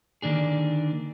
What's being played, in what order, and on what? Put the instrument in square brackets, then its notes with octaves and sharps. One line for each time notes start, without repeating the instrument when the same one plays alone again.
[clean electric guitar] D3 D#3 A#3 D4 G#4